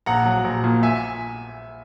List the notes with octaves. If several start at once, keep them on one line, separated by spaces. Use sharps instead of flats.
A#1 F#5 A#5
F#3
A#1
A#2
E5 G#5